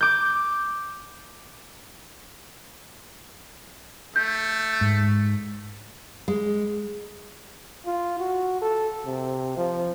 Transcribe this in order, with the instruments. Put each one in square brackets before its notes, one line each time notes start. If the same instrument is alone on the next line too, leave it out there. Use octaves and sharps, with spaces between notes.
[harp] D6 G6
[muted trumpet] A3 [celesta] G6
[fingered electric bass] G#2
[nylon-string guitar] G#3
[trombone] F4
F#4
A4
C3
F3